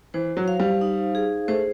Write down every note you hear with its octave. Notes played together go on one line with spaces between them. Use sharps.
E3 C5
F#3
F5
G3
D#4
G#4
A3 C5